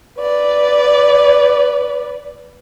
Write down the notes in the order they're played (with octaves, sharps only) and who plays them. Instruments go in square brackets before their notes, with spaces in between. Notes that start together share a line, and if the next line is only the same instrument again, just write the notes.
[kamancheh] B4 D5